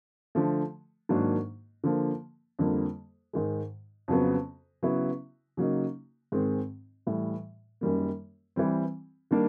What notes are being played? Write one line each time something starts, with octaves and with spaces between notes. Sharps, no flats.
D3 F3 A3
G#2 D#3 F#3 A#3 D4
D3 F3 A#3
F2 D3 G3 A#3
G#2 D#3 G#3
F2 C#3 F#3 B3
C#3 F#3 B3 E4
C#3 F#3 A#3 D#4
G#2 D#3 G#3 C4
A2 E3 G3
F#2 D#3 G3 A#3
E3 G3 C4
D#3 G3 A#3 D4